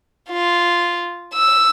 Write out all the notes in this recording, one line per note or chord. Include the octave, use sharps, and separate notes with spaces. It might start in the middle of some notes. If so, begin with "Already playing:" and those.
F4
E6